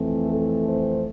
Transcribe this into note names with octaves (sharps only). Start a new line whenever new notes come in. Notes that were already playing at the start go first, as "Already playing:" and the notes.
Already playing: F2 E3 A3 C4
A4
C5